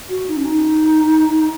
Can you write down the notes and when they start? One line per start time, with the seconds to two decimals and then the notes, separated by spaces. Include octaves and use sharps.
0.10 F#4
0.28 D#4
0.37 C#4
0.45 D#4